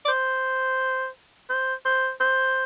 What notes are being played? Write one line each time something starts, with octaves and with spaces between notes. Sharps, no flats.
D5
C5
C5
C5
C5